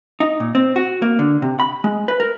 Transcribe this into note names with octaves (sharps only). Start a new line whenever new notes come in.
D#4
A#2
C4
F#4
A#3
D3
C3
B5
G#3
B4
A#4